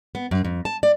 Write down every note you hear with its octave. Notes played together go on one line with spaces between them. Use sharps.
B3
F#2
F2
A5
D5